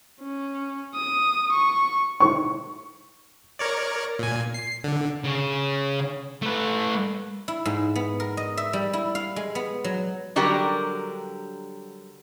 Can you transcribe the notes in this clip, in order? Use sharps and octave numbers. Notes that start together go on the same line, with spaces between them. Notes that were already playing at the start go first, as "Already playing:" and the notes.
C#4
D#6
C#6
C#6
A#4 C#5 D5
A#2 G#5
C7
D3
C#3
A3 B4
E4
G#2
B3
A#4
D#5
E5
G3
E4
F5
G#3
B3
F#3
D3 F#3 G3 G4 A#4